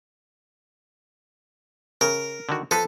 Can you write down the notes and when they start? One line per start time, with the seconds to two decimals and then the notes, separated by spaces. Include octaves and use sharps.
2.01 C#3 A#4
2.49 D3 D#3 F#4
2.71 F3 A4 B4